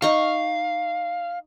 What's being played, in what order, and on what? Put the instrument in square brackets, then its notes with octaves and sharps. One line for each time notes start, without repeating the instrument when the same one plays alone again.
[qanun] D#4 C#6 [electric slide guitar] F5